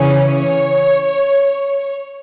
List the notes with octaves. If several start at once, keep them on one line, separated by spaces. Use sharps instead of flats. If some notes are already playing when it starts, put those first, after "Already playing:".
Already playing: C#3 E3 C#4
C#5